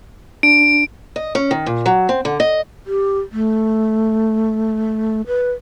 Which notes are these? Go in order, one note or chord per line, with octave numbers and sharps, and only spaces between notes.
D4 D7
D#5
C#4
D#3
A#2
F#3
C4
D3
D#5
G4
A3
B4